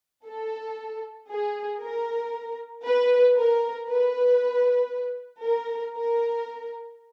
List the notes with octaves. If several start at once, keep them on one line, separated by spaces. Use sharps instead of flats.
A4
G#4
A#4
B4
A#4
B4
A#4
A#4